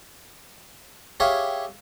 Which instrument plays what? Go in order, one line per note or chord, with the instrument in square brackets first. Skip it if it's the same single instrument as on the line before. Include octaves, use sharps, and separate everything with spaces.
[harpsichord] G4 G#4 C#5 E5 F5